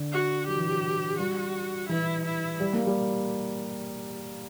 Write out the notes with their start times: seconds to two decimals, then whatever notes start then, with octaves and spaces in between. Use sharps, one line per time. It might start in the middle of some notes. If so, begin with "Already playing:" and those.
Already playing: D3
0.12 F#4
0.47 F#3 G4
0.56 E3
0.67 F#3
1.18 G3 F#4
1.89 E3 E4
2.25 E4
2.60 G3
2.73 A#3
2.87 G3